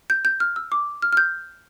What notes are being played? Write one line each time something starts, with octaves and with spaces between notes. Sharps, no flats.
G6
G6
F6
E6
D6
F6
F6
G6